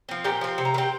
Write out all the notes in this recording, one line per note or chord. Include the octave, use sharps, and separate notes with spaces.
F3 C4
A#2 G4 G5
F3 C4
C3
A#5
D#3
C4 G5